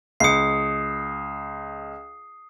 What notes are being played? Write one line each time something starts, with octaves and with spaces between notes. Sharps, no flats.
C#2 D#6 C7 C#7